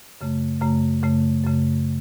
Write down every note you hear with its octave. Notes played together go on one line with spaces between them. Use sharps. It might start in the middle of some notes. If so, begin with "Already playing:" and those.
F#2 C#3 A3
F#2 C#3 A3
F#2 C#3 A3
F#2 C#3 A3